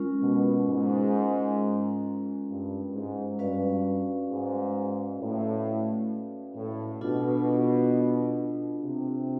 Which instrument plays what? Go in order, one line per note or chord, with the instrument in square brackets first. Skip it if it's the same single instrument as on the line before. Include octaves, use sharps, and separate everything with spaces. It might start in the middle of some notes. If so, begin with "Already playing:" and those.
Already playing: [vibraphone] G#3 C#4 F4 A#4
[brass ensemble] B2
G#2
G2
G#2
[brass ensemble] G2 [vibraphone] C#4 F#4 B4 D5 F5
[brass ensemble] G#2
A2
A2
[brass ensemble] B2 [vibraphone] D4 F4 A4
[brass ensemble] C3